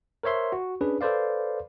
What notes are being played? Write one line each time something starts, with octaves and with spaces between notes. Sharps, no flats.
A#4 C5 C#5 E5 C6
F#4
C#4 D4 G#4 B4
A4 B4 C5 D5 F5